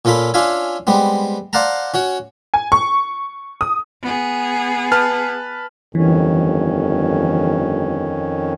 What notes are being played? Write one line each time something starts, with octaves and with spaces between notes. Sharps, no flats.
A#2 C#4 F4 A4 B5
C#4 D4 F4 E5 F5 G#5
G3 G#3 B3 C4
C5 D5 F5 F#5 A5 A#5
C#4 F#4 C#5
G#5
C#6
D#6
B3 G#4
B4 A5 F6
G1 F2 D#3 E3 C#4